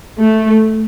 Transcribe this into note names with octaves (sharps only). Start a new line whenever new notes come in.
A3